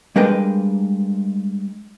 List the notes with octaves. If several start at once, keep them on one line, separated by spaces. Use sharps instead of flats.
G3 G#3 D4 A#4 B4 G5